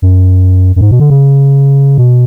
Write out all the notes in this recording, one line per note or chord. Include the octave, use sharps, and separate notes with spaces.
F#2
F#2
G#2
B2
D3
C#3
B2